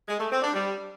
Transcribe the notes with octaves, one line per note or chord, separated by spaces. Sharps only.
G#3
A3
C4
D4
G3